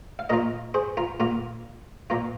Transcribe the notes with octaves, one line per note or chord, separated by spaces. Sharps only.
F5
A#2 A#3 F4 A#4 D#5
G#4 C5
F4 A#4
A#2 A#3 F4 A#4
A#2 A#3 F4